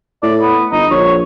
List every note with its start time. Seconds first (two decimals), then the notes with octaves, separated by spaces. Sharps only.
0.23 A2 D5
0.41 B3
0.71 G1 D#4
0.91 A#1 C#5